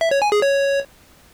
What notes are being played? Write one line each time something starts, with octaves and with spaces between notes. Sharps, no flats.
E5
C#5
G#5
G#4
C#5